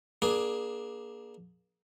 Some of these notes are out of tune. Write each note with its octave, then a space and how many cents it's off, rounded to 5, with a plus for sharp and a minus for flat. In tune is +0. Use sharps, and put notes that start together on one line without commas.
A#3 +30 D4 +0 G#4 +10